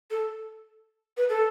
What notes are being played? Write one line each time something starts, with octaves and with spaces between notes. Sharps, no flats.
A4
B4
A4